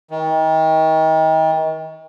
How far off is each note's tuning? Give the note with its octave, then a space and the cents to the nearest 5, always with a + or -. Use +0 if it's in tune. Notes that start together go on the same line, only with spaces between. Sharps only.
D#3 +35